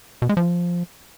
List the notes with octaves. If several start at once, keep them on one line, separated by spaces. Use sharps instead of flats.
B2
G#3
F3